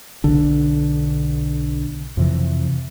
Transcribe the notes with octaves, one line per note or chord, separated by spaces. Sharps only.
B1 D3 D4
F2 C3 E3